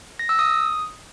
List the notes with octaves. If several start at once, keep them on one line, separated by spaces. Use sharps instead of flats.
A#6
E6
D#6